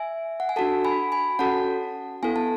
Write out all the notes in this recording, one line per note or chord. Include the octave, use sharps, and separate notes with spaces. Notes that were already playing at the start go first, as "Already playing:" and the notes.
Already playing: E5 G#5
F#5
G#5
D4 F#4 A4 F#5 A5
G#5 B5
G#5 B5
C#4 F#4 A4 F#5 A5
B3 E4 A4 G#5
A5